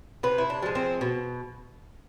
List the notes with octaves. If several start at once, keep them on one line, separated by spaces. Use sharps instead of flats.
C3 B4
E4
D4
F3 G#3
C4
B2